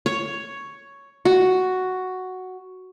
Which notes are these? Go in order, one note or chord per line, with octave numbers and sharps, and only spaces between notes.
C#5
F#4